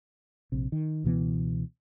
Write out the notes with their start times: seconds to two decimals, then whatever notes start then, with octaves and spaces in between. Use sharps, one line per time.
0.52 A#1 C3
0.72 D#3
1.04 C#2 B2 E3 B3